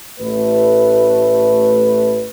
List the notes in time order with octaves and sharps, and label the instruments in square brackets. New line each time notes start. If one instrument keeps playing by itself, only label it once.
[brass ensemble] A1 A3 B4